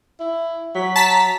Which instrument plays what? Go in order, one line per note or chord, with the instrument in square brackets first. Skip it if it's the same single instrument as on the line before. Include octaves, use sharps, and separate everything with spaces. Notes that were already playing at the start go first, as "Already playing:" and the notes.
[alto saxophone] E4
[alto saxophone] F#3 [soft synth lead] B6
[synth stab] A5 B6 [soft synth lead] A#5